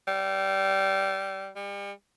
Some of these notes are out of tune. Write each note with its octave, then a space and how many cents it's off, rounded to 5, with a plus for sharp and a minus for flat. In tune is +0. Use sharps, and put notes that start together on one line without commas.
G3 -20
G3 +40